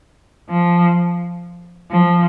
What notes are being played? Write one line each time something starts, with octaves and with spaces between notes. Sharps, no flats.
F3
F3